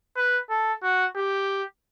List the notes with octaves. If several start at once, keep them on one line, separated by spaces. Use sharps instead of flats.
B4
A4
F#4
G4